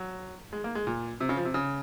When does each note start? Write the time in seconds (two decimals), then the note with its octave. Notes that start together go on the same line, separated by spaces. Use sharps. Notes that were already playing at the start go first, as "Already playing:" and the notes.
Already playing: F#3
0.53 G#3
0.64 A#3
0.75 G#3
0.87 A#2
1.20 C3
1.29 C#3
1.37 F3
1.45 C3
1.54 C#3